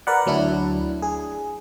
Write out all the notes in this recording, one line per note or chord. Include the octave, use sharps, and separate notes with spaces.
A#4 B4 D5 F#5
D2 F#3 D4 E4
G#4